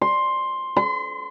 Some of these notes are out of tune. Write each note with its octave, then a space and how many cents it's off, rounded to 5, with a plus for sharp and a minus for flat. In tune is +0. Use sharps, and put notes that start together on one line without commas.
C6 +10
C6 -40